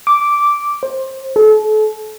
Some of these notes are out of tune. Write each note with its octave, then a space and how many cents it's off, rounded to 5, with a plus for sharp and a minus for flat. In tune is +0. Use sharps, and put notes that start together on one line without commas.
D6 -5
C5 +20
A4 -35